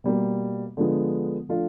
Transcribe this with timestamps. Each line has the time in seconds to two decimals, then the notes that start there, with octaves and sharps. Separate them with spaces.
0.04 B2 G3 A#3
0.77 D3 F3 G#3 B3
1.49 F3 A3 D4 F4